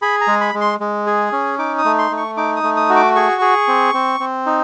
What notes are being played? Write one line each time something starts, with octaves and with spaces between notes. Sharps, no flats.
G#4 B5
A#5
G#3
B5
G#3
C6
G#3
G#4
C#4
D#4 D6
D#6
A3
C6
A3
C#6
D#4 D6
D#6
A3
D#6
F#4
D6
G#4 C#6
G#4
C4
C4
C4
D#4